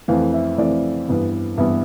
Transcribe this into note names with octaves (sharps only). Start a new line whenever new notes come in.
F2 E3 A3 F5
E5
F2 E3 A3 D5
G2 E3 B3
G2 E3 B3 E5